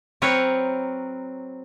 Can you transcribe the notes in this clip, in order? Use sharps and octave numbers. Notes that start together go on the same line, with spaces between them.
F#3 C4 A#4 B4 C#5